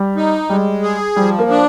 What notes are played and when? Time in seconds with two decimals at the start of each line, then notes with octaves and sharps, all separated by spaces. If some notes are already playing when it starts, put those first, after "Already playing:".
Already playing: G3
0.16 D#4
0.50 G3 G#3
0.83 G#4
1.16 F3 G3
1.39 A#3
1.50 D4